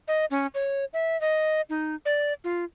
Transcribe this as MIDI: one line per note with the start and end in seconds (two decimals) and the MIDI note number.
0.08 0.25 75
0.30 0.47 61
0.54 0.85 73
0.93 1.19 76
1.21 1.61 75
1.69 1.95 63
2.05 2.33 74
2.44 2.64 65